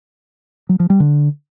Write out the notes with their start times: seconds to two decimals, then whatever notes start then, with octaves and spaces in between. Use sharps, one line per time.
0.69 F#3
0.80 F3
0.90 G3
1.00 D3